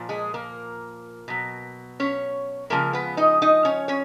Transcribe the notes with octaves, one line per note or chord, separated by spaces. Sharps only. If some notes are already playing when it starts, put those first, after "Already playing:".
Already playing: A#2 F3
G#3 G#4
A#3 A#4
B2 F#3
C#4 C#5
C#3 F3 G#3 A#3 A#4
B3 B4
D#4 D#5
D#4 D#5
C#4 C#5
C#4 C#5